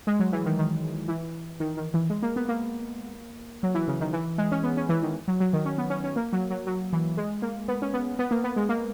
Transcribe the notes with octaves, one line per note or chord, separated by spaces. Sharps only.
G#3
F#3
E3
D#3
D#3
E3
D#3
D#3
E3
G#3
A#3
B3
A#3
F#3
E3
C#3
D#3
E3
G#3
C#4
B3
C#4
E3
D#3
F#3
F#3
D#3
C#4
B3
C#4
C#4
A#3
F#3
F#3
F#3
E3
G#3
A#3
B3
C#4
B3
B3
A#3
B3
G#3
A#3